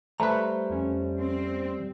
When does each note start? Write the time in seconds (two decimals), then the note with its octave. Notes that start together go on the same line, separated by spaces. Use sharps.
0.20 G3 A3 B4 C5 A#5
0.70 F2 C#4
1.21 C4